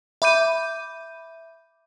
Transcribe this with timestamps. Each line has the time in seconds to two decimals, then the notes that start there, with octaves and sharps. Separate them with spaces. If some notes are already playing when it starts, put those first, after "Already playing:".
0.22 E5 B5 D6 G6 D#7